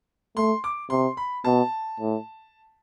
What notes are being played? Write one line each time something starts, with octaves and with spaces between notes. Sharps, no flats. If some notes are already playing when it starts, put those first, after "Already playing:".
A3 C6
D6
C3 C6
B5
B2 A5
A2